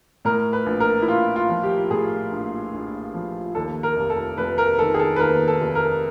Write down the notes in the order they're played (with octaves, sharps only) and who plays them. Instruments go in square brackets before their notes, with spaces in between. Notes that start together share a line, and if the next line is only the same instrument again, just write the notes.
[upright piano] A2 A#4
B4
A#1
A#4
E4
A#1 F4
F4
F3
G4
A2 G#4
A#1
A#1
F3
D#2 A4
A#4
F1
A4
F1 B4
A#4
D#3 A4
G#4
A4
B4
D#2 A#4
A4
F1
A#4